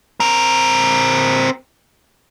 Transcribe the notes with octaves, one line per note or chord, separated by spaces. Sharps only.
C4 A#4